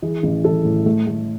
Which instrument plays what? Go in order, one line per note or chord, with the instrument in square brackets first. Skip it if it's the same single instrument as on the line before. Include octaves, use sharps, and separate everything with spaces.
[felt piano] E3 G#4
A1
E3 A4
A2
A3
A3